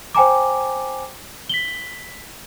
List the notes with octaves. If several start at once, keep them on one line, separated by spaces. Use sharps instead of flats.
C5 G5 G#5 A#5 D6
B6 F#7 G7